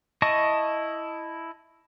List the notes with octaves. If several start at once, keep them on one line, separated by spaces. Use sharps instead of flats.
E4 D#5 A5 C#6 D#6